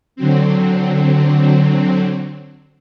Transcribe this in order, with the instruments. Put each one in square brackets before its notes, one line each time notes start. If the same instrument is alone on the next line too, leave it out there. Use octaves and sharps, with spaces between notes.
[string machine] D3 F#3 C4